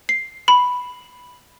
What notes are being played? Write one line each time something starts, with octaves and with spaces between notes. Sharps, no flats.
C7
B5